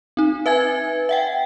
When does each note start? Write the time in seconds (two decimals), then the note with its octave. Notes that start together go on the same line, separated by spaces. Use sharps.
0.17 C4 D#4
0.46 B4 E5 G#5 G#6
1.09 E5 F#5 G5